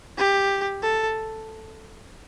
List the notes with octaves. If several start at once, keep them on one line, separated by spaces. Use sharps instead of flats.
G4
A4